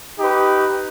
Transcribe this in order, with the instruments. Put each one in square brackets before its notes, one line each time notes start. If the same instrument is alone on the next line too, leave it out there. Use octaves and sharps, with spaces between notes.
[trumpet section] D#4 G4 B4